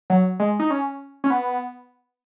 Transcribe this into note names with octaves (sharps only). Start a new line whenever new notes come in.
F#3
G#3
D#4
C#4
C#4
B3